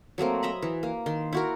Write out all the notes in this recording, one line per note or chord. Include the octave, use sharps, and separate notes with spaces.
F#3 A3 A#3 C4
D#5 E5 A#5 B5
E3
A#3
D#3 C6
E4 F#4 A#4